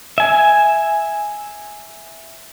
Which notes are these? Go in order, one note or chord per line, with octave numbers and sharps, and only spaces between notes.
E5 G#5